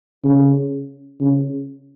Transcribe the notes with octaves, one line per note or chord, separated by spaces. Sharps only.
C#3
C#3